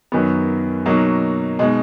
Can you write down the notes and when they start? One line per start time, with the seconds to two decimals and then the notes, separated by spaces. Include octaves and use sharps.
0.12 F#2 D#3 F#3 B3
0.86 B2 F#3 A#3 D#4
1.59 B2 G#3 D#4